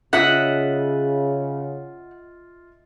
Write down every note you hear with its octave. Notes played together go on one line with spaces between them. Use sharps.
C#3 F4 D#5 E5 F#5 F#6